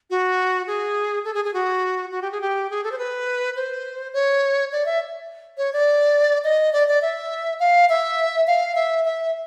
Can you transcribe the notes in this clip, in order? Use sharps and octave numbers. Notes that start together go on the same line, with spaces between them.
F#4
G#4
A4
G#4
G#4
F#4
F#4
G4
G#4
G4
G#4
A4
C5
B4
C5
C#5
D5
E5
C#5
D5
D#5
D5
D5
E5
F5
E5
F5
E5
E5